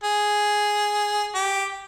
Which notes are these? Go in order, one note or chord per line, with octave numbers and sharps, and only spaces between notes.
G#4
G4